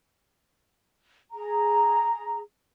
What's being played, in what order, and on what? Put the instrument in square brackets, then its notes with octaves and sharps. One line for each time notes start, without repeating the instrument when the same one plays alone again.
[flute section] G#4 A#5